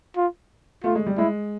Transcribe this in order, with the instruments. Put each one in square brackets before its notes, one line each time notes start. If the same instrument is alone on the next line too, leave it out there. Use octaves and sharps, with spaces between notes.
[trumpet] F4
[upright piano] A3 [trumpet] F4
[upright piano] G#3
G3
[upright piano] G#3 [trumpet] E4